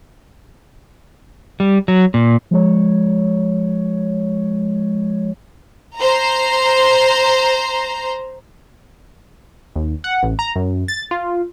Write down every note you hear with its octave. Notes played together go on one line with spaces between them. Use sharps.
G3
F#3
A#2
F3 G#3 C#5
C5 A#5
D#2
F#5
A1
A#5
F#2
A6
F4